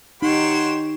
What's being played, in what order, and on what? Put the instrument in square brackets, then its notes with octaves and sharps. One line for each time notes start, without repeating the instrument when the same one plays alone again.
[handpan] D#4 [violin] G4 E7 [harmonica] C#5 F#5 C6